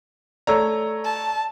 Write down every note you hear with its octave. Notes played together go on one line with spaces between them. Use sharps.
A3 C#5 D5 A#5 E6
A5